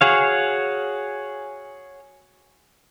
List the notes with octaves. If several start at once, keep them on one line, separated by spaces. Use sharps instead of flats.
F#4 G#4 C#5 F5